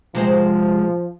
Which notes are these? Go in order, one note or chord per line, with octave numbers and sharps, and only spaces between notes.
C3 F3 G#3 C5